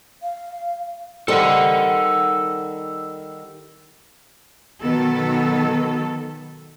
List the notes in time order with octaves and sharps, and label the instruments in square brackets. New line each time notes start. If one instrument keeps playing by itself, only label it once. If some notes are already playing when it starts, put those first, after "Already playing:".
[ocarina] F5
[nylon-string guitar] D#3 G3 C4 [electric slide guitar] A4 F#5
[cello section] B2 D#3 F#3 B3 A4